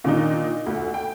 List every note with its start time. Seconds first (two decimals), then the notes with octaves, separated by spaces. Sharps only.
0.04 A#2 D#3 D4 D#4
0.66 D2
0.94 G5